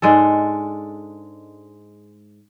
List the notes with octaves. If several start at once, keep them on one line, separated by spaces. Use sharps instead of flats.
G#2 G#3 D4 A4